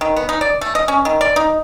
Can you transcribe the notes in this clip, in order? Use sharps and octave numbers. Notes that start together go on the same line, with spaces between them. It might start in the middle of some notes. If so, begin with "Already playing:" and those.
D#3
B3
D#4
D5
A3
D#5
C#4
D#3
D5
D#4